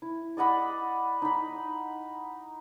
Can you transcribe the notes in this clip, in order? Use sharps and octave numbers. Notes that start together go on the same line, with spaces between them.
E4
D5 D#5 F#5 B5
D#4 B5